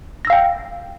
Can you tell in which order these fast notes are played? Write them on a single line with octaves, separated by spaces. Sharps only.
A#6 E6 F5 G5